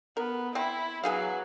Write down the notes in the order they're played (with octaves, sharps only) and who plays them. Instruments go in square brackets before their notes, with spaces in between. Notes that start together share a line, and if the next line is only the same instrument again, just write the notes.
[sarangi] B3 [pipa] A#4
[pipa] C4 [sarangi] E4
[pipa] E3 G#4 F5 [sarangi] F#3